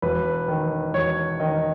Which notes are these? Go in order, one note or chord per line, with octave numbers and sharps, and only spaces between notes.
E1 B4
D#3
E1 C#5
D#3 D#5